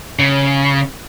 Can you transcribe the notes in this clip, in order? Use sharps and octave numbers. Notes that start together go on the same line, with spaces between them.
C#3